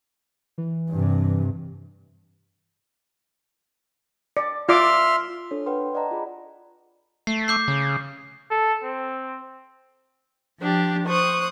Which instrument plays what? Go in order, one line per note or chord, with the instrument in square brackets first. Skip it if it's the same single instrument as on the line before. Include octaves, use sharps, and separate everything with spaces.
[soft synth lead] E3
[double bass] G2 C3
[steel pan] D5
[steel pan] F4 D5 D6 [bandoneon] E5 C6 F6
[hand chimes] D4 A4 C5 C#5
B4 F#5 G5 C6
D5 D#5 F#5 A5 A#5
F4 G#4 B5
[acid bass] A3 [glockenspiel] C7
[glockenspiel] D6 G6 C7
[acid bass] C#3
[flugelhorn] A4
C4
[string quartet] F3 D4 G4
C5 C#6 D#6 F#6